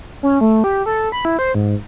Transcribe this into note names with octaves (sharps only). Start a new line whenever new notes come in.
C#4
A3
G4
A4
B5
E4
C5
G#2